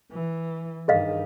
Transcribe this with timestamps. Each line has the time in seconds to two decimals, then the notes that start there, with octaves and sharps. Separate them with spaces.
0.12 E3
0.88 G2 D#3 G#4 D#5 F5